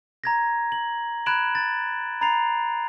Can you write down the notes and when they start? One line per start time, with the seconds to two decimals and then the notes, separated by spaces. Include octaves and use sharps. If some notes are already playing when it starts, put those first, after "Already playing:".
0.24 A#5 G#6 A#6
0.72 F#7
1.26 B5 F#6 G#6 D7 E7 F#7
1.55 A6
2.21 A#5 B5 A6 C7 F7